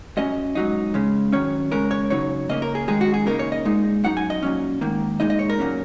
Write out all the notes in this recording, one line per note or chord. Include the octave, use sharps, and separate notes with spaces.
F#2 F#3 C#4 D#5
G#2 F#3 D#4
C#3 G#3 C#4
F#2 D#3 F#3 C#4 C#5
C#3 G#3 C#4 A#4
C#5
F#2 C#3 F#3 D#4 C#5
C#3 A#3 C#4 D#5
A#4
G#4
F#2 D#3 G#3 D#4 G#4
F#4
G#4
C#3 A#3 D#4 A#4
C#5
D#5
A#2 G#3 D#4
F#2 F#3 D#4 F#5
G#5
D#5
A#2 F#3 C#4
G#2 D#3 A#3
A#2 G#3 D#4 D#5
D#5
C#5
A#4
A#2 F#3 A#3 C#4